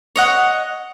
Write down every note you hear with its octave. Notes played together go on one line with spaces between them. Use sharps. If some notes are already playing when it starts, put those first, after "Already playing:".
C#5 D#5 F#5